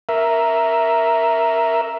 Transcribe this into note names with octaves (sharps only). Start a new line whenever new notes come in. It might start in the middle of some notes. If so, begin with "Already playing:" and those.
A#4 E5